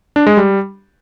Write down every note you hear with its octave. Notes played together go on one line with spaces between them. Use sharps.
D4
G#3
G3